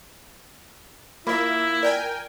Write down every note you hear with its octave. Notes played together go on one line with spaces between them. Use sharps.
A#3 E4 F4 A#4 E5
A#4 D5 G5 G#5